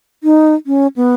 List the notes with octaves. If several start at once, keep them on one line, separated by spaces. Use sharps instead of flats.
D#4
C#4
B3